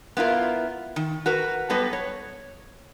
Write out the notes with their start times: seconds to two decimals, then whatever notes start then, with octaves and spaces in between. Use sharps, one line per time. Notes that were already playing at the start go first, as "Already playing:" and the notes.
0.17 B3 E4 F4 A#4
0.96 D#3
1.26 F#4 A#4 B4
1.70 F#3 G3 B3 A4 B4 D#5
1.93 C#5